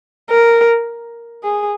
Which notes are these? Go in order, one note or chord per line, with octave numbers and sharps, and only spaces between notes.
A#4
G#4